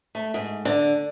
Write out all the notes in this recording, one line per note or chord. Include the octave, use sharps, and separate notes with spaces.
A3
G#2
D3